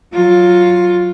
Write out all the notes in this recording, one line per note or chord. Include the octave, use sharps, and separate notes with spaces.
F#3 F4